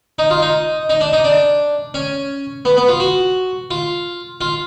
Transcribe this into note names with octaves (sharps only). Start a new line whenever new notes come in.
D#4
F4
D#4
D#4
D4
D#4
D4
C#4
B3
B3
F4
F#4
F4
F4